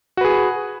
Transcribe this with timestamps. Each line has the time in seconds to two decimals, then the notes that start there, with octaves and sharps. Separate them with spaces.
0.17 F#4
0.21 B4
0.25 G#4